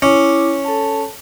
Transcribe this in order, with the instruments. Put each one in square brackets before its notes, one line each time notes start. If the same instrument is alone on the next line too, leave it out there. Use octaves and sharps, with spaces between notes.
[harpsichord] C#4 [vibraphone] E4 D6
[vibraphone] A4 A5